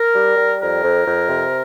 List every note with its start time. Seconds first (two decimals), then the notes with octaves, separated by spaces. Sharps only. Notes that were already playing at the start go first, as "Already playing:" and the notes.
Already playing: A#4
0.14 G3
0.37 G3
0.60 F2 A#4
0.83 F2
1.06 F2
1.29 C3